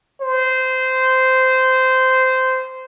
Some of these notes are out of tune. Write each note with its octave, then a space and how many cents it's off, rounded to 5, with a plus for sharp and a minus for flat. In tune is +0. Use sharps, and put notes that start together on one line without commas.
C5 -15